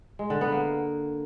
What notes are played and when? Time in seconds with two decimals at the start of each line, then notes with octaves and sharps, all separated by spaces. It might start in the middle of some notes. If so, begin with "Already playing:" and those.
0.19 G#3
0.30 D3
0.41 B3
0.52 A#3